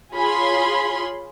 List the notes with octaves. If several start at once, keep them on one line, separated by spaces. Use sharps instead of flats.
F4 G#4 C#5 B5 C6